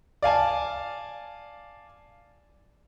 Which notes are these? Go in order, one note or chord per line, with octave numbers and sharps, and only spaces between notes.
D5 F5 G#5 A5